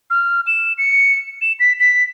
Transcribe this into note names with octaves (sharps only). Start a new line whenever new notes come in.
F6
E7
C#7
E7
B6
B6